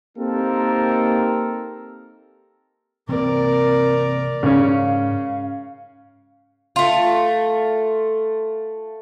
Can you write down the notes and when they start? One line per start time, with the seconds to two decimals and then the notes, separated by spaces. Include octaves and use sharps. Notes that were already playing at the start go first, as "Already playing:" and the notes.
0.17 A#3 C4 D#4 G4 A4 A#4
3.09 C3 E3 A#3 C4 A#4 D5
4.43 G#2 C#3 C#4 F5
6.76 A3 F4